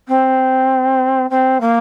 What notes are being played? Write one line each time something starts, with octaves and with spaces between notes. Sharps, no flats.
C4
C4
A#3